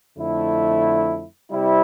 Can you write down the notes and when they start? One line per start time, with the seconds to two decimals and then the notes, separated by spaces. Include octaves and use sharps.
0.17 F2 D3 A3 E4
1.52 C3 G3 C4 E4